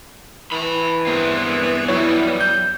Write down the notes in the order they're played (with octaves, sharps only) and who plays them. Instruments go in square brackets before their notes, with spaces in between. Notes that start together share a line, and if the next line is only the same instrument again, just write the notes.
[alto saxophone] E3 [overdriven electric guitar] A5 B5
[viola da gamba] G2 B3 G#4 [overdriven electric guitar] C4 A#4
[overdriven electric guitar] F#3 G3 [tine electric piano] E4 C#5
[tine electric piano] G6